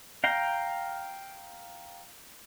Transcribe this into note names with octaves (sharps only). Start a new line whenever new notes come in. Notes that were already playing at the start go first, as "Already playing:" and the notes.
F5 G5 A#5